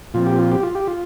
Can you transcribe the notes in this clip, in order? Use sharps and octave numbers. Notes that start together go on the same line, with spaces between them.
A#2 F3 C4 F4
G4
F4
G4
F4
G4
F4